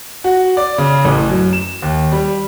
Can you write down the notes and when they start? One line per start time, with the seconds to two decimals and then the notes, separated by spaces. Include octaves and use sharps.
0.24 F#4
0.57 D5
0.78 C#3
1.05 A1
1.29 F#2
1.53 E7
1.82 D#2
2.12 G3